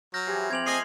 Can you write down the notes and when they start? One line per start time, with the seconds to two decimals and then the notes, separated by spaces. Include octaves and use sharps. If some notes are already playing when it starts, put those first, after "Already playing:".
0.14 F#3 F6 G6 A#6
0.26 E3 F3 G4 G#4
0.51 F3 C4 D6 G#6 F7 F#7
0.66 A3 G#4 D#5 G#5 C7